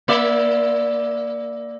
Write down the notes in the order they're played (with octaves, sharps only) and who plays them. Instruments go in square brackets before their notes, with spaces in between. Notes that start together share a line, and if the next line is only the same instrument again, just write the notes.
[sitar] A#3 D5 E5